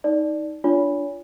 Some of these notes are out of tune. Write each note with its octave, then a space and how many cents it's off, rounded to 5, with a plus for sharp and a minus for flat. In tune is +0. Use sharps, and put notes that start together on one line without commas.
D#4 +15 D5 +5
D4 +0 F4 -15 C#5 +40